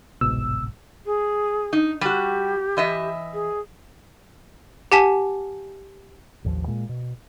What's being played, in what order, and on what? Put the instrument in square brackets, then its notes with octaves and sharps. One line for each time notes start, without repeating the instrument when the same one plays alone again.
[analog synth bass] G1 [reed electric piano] C2 G#2 B2 [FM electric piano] E6
[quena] G#4
[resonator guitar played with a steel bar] D#4
[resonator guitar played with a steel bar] G3 F#4 [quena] G4
[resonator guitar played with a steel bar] E3 D#5 E5
[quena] G#4
[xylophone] G4 F#5 G#5 A5 B6 E7
[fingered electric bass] A1 D#2 F3
A#2 G#3
B2